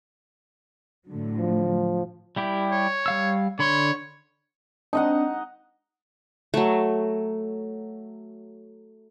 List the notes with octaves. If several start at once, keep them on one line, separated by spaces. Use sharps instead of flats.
A2 D3 F#3
F3
G3 E4 G4
C#5
G3 F5 E6
D3 C#5 B5 C6
C4 D4 D#4 D#5 F#5
F#3 A3